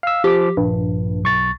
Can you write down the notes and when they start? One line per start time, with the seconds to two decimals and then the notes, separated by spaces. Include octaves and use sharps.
0.03 F5 E6
0.24 F3 G4 D6
0.57 A#1 G2
1.24 B1 C#6 A6